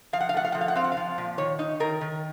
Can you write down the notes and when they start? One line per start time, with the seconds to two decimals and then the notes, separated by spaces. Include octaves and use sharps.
0.13 F3 F5
0.20 F#5
0.29 F5
0.34 A3 F#5
0.45 F5
0.52 F3 F#5
0.61 F5
0.68 F#5
0.75 C4 F5
0.84 F#5
0.92 F3 F5
1.18 A#2
1.38 D#3 C#5
1.59 D#4
1.80 D#3 A#4
2.01 D#3